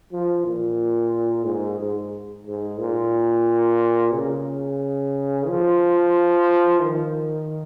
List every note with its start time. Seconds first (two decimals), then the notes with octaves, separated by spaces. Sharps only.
0.12 F3
0.46 A#2
1.46 G#2
1.80 G#2
2.47 G#2
2.80 A#2
4.14 C#3
5.48 F3
6.82 D#3